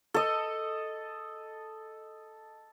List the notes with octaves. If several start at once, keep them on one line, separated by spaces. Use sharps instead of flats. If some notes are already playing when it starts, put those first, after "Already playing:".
A4 D#5